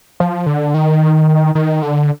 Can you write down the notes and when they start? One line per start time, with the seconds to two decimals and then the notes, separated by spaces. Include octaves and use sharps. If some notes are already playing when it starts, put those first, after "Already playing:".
0.20 F3
0.46 D3
0.74 D#3
1.55 D#3
1.82 D3